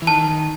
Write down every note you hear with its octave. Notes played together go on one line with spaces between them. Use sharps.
E3
D#3 A5